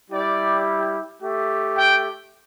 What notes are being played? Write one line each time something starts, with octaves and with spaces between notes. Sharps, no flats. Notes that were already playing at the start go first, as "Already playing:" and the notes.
G3 E4 G4 D5
A3 G4
G5